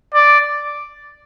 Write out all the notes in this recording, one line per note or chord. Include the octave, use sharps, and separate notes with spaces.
D5